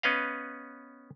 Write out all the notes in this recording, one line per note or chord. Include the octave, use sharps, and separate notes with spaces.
B3 C#4 B4 D#5 F5